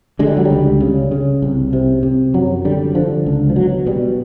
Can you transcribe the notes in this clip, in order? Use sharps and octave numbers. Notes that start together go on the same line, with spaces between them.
D3 G#3
G3
F#3
C#2 G3
C#3
C#3
C2
C3
C3
F#2 F#3
D3 G3
D3 F3
C#2
F3
B2 F#3
B2 G3